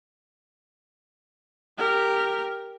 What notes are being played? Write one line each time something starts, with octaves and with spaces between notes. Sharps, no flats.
G4 A#4